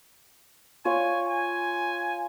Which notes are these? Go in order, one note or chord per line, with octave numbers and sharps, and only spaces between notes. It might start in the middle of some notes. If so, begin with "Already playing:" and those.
F4 C#5 G#5
G#5